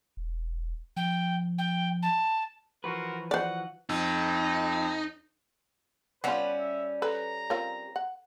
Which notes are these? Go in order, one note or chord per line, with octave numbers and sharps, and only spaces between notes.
E1
F3 G5
G5
A5
E3 F3 F#4 A#4 B4 C6
F#4 C5 D5 F#5
F2 D#4
G3 B3 C#4 F4 B4 F#5
E5
A4 B4 A#5
C4 F4 A#4 C#5
F#5